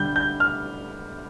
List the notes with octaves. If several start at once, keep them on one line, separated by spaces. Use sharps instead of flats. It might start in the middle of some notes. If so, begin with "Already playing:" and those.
Already playing: D3 G3 G6
G6
F6